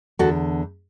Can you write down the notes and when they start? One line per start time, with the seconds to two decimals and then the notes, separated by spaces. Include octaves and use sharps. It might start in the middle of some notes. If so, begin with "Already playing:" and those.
0.19 E2 D3 F#4 A4